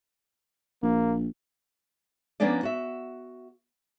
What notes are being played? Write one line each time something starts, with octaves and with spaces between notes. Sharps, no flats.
A#1 A#3
F3 A#3 B3 C#4 D4 D5
F#4 E5